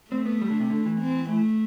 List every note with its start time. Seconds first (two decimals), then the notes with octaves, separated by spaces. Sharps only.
0.11 A3 C4
0.26 B3
0.42 G3
0.50 D3
0.60 C3
0.70 D3
0.86 E3
1.00 C4
1.30 A3